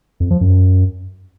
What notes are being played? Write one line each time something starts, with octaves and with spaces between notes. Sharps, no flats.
F2
F3
F#2